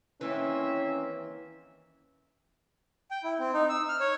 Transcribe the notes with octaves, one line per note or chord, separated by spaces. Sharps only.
D#2 E3 A#3 C4 C#4 E5
G5
E4
C4
D#4
E6
F6
C#5